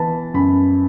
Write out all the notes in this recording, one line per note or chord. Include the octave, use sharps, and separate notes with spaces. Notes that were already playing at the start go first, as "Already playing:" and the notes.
Already playing: E3 B3 A5 B5
F#2 B5